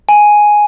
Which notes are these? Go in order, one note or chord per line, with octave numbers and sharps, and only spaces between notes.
G#5